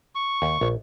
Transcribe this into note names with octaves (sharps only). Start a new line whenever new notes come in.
C#6
D#2
A#1